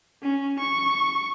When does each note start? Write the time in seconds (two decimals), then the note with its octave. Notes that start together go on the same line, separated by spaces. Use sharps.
0.22 C#4
0.59 C#6